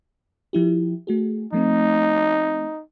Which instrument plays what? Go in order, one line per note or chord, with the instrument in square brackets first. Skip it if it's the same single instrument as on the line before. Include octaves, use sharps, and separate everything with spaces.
[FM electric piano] F3 E4 G4
A3 F#4 G#4
[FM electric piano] F3 A3 C4 [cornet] D#4